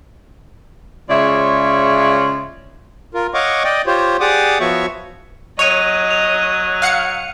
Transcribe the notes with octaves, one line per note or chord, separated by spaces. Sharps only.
C#3 G#3 F4 C#5 D5 E5
F4 A#4
C#5 D#5 F5 F#5 C#6 D6
D5 D#5 G5
F4 G4 C5 C#5
G4 G#4 D5 F#5 D6 D#6
F3 B3 F#4 C#5 E5 C#6
F#3 C#5 D#5 D#7 F7
F7
F5 F#5 C#7